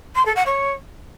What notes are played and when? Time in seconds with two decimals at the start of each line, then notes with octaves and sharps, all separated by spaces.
0.15 C6
0.25 A4
0.35 F#5
0.46 C#5